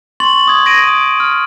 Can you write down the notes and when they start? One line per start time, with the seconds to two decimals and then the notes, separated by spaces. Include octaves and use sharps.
0.20 C6 C#6 A6 F#7
0.48 D#6 G#6
0.65 G#6 A#6 D7 D#7
0.88 D#6
1.20 F6